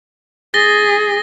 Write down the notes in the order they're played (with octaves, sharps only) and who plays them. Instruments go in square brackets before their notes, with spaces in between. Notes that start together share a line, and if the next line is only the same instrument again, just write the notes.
[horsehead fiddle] G#4 [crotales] A6 A#6 G7